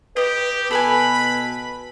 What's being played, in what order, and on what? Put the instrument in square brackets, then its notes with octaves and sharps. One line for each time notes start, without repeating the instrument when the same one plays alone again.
[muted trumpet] G4 [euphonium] B4 [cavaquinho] D#5
[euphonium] B2 [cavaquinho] A4 B4 G#5 [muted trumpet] B5